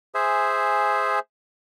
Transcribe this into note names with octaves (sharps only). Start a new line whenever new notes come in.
G#4 C5 E5 G#5